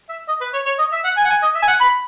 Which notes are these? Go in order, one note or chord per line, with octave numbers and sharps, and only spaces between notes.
E5
D#5
B4
C#5
C#5
D#5
E5
F#5
G#5
F#5
G#5
D#5
E5
G#5
F#5
B5